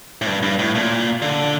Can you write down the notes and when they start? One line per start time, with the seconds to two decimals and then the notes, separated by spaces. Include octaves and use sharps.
0.22 A2
0.27 G2
0.43 G2
0.59 A2
0.75 A#2
1.22 D3